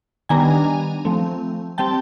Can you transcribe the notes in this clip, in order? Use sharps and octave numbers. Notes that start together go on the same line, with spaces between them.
D#3 G3 B3 D4 G#5 A#5
F3 A3 C4
G3 C4 G5 A5